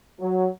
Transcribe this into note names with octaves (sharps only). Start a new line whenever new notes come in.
F#3